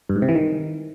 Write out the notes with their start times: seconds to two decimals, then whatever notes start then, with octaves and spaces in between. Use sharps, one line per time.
0.09 G2
0.16 G#2
0.22 C3
0.29 E3
0.35 D#3